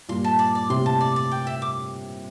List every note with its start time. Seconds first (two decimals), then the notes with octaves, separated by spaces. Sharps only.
0.09 G2 A#2 C6
0.24 A5
0.39 D5
0.55 D5
0.70 A2 C3 C6
0.86 A5
1.01 D5
1.16 D5
1.31 G5
1.47 E5
1.62 D6